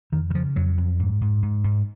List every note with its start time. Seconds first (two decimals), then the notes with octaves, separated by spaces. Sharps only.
0.12 F2 D#3
0.30 D#3
0.34 C#3 F3
0.56 F2 F#3
0.77 F2
0.99 G#2
1.21 G#2
1.43 G#2
1.64 G#2